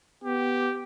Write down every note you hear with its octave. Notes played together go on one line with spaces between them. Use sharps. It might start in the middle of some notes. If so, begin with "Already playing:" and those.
B3 G4